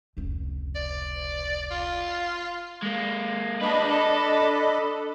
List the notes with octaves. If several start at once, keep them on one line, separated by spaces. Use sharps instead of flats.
F1 C#2
D5
F4
G#3 A#3
D4 G#4 B4 D#5 B5
A4